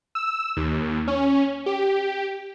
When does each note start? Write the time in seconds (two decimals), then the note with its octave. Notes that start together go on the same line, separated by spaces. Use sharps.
0.15 E6
0.57 D#2
1.08 C#4
1.66 G4